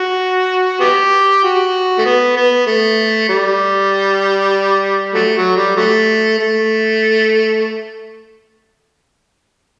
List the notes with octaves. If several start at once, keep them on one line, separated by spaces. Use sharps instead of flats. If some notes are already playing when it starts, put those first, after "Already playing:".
Already playing: F#4
B3 G4
F#4
A3
B3
B3
A3
G3
F#3 A3
F#3
G3
F#3 A3
A3